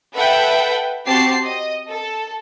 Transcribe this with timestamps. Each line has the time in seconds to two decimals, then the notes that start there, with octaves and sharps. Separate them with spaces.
0.13 A4 B4 E5 F#5 G5
1.06 C4 F#4 G4 A5 C7
1.45 D#5
1.89 A4